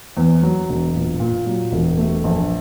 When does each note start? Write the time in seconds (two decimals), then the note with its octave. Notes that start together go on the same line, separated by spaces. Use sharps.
0.17 E2
0.43 F#3
0.69 E1
0.95 A#2
1.20 A#2
1.46 F#3
1.72 E1
1.97 A3
2.24 A#1